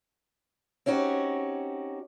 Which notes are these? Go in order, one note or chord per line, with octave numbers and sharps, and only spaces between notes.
C4 C#4 D#4 F#4 G4